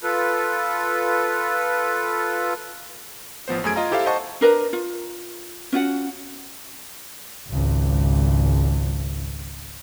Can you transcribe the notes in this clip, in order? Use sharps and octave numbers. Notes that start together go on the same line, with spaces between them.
F4 A4 B4
A1 F3 B3 C5
F#2 A3 G#4 G#5 G#6 D7
F4 D#5 F5 A#5
E4 G4 A4 C5 E5 F5
C5 D#5 F#5 A5 C#6
D4 A#4 B4 A#5
F4
C#4 F4 F#4 F#5
G#1 C#2